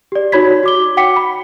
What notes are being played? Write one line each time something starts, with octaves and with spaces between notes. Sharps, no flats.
G4 D5
D#4 F#4 C#5 B5 G#6 B6
F#4 D6 G7
F#5 G5 D6 B6 C#7
B5